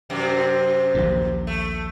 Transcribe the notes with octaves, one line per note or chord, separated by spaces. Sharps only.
F#2 C3
A#1 D#2 A#2
A3